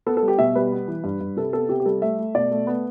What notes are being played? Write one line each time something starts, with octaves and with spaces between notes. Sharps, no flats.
B3 A4
A4
G3
G4
B2 E5
G3 B4
B3
E3
G2
G2
C3 A4
B3 A4
C3 G4
G4
G3 A4
A3 E5
A3
B2 D5
A3
B3